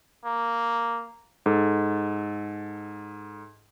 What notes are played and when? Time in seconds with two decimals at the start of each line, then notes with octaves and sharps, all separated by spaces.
0.25 A#3
1.46 G#2 A4